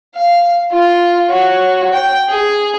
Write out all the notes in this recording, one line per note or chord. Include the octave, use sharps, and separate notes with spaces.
F5
F4
F#4 C#5
G5
G#4